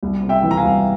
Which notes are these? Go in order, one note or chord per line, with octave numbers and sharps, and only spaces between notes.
C2
C3
E5 G5
E3
A#5
F5 G#5
C2